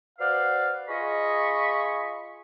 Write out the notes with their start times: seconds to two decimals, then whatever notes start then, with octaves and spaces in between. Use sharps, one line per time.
0.19 F#4 B4 C5 D5 F5
0.88 F4 G#4 D#5 G#5 B5 C#6